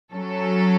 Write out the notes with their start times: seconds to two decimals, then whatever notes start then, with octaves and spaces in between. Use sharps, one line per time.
0.14 F#3 C#4 A4